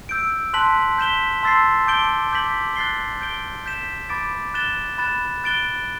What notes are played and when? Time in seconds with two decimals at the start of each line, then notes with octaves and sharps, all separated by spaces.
0.09 E6 G6 D7
0.53 A5 C6 F#6 B6 F#7
0.98 G6 B6 E7 G7
1.43 A5 C6 E6 A6 C7
1.87 A5 D6 G6 D7 G7
2.32 D6 G6 B6 F#7
2.76 F#6 A6 C7 G7
3.21 G6 D7 G7
3.66 G6 B6 E7
4.09 B5 D6 A6 D7
4.54 F#6 A6 E7 G7
4.98 B5 F#6 A6 E7
5.44 F#6 A6 D7 G7